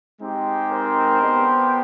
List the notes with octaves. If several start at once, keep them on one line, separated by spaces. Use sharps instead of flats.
G#3 C4 D#4 G4
A#4 C5
B3 D4 G4